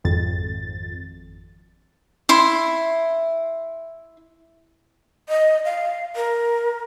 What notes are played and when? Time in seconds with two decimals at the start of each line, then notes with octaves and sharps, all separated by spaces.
0.04 G#1 F2 A6
2.29 E4 C6
5.29 D#5
5.65 F5
6.16 A#4